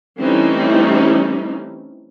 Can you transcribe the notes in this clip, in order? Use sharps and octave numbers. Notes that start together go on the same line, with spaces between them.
E3 G3 A3 C4 C#4 D#4